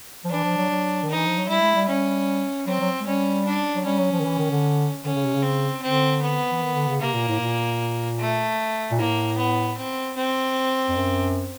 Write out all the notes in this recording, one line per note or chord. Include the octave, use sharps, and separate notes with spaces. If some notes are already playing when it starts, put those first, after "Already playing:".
F3
E3 D4
F3
F#3
F#3
D#3
E3 D#4
F3
F#3
G3 E4
G#3
G3
G3 C#4
F#3 C4
F#3
G#3
G3 C#4
D4
F#3
G3 C#4
F#3
F3
D#3
E3
D#3
D3
D3 C#4
C#3
C3
C#3
C4
D3 C4
B3
E3
D#3
D3
C#3
C3 A#3
A#2
A2
A#2
A3
A#2
A2 A#3
B3
C4
C4
F2
F#2